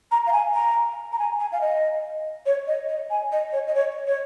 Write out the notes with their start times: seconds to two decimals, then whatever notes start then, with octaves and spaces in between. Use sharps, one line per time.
0.11 A#5
0.27 F5
0.33 G#5
0.54 A#5
1.12 A#5
1.19 G#5
1.40 G#5
1.52 F5
1.61 D#5
2.46 C#5
2.67 D#5
2.89 D#5
3.10 G#5
3.32 D#5
3.53 C#5
3.67 D#5
3.75 C#5
4.07 C#5